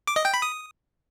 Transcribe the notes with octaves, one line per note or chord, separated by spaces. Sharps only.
D6
D#5
G5
B5
D#6